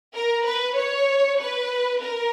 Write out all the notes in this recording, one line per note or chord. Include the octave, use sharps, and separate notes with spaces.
A#4
B4
C#5
B4
A#4